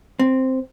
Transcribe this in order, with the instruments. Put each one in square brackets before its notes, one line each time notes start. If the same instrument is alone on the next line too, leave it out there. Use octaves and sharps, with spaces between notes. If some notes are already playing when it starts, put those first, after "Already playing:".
[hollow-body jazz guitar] C4